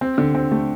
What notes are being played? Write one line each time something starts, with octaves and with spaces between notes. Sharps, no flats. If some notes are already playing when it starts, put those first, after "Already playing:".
C4
D3
C4
A3